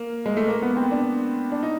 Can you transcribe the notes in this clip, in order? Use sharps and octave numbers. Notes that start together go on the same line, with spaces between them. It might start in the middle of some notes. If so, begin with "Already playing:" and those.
Already playing: A#3
G#3
A3
A#3
B3
C4
D4
D4
D#4